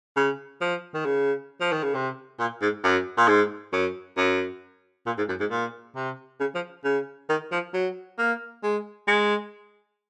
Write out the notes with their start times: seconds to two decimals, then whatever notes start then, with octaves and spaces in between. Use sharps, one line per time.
0.16 C#3
0.61 F3
0.94 D#3
1.05 C#3
1.60 F3
1.72 D#3
1.83 C#3
1.94 C3
2.39 A#2
2.61 G#2
2.84 F#2
3.17 A#2
3.28 G#2
3.73 F#2
4.17 F#2
5.06 A#2
5.18 G#2
5.29 F#2
5.40 G#2
5.51 A#2
5.96 C3
6.40 C#3
6.55 F3
6.84 C#3
7.29 D#3
7.52 F3
7.74 F#3
8.18 A#3
8.63 G#3
9.08 G#3